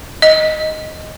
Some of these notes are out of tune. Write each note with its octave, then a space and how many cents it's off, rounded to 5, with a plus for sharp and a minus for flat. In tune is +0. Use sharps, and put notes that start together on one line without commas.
D#5 +5